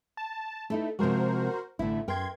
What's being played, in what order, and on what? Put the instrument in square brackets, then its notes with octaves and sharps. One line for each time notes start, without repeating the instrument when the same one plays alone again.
[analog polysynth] A5
[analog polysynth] A3 [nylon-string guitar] D#4 E4 A4
[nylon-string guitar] C3 F3 G#3 [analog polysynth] F#4 A#4 C5
[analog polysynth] A1 A3 [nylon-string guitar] D3 E4
[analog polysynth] F#2 C6 G#6 [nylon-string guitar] A#4 G5